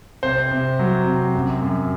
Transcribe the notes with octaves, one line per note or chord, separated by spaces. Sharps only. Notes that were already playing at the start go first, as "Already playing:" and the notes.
C3 C5
C3
F#3
C3
F#2
F#2